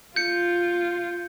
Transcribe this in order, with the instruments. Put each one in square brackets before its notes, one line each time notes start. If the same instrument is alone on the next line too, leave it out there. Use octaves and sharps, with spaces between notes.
[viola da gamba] F4 [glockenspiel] G6 C#7